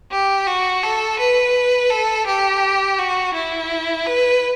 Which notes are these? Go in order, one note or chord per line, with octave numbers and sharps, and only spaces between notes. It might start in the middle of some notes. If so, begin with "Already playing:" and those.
G4
F#4
A4
B4
A4
G4
F#4
E4
B4